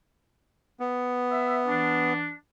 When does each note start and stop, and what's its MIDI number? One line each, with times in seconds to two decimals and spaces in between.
0.80 2.13 59
1.32 1.60 76
1.68 2.32 52
1.68 2.32 62